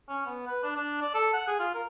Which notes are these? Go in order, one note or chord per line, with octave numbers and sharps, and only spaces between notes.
C#4
B3
B4
D4
D4
D5
A4
F#5
G#4
F4
A#4